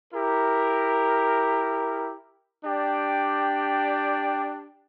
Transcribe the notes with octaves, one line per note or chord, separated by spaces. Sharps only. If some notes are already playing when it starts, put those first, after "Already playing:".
E4 G4 A#4
D4 G4 D5 G5